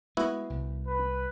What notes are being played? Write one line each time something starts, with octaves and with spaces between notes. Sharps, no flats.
G#3 B3 E4 F#4
C2
B4